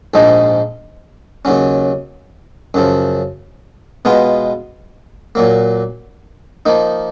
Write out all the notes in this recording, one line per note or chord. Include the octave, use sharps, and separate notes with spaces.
A#1 G#2 F3 G#3 D#4
D#2 C#3 F#3 C#4
F#2 C#3 F3
B2 G#3 B3 F4
A#2 F#3 A#3
F3 A#3 D#4